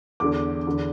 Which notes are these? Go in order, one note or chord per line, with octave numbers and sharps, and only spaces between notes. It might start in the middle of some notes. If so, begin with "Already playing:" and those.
E2 D3 D6
E2 D3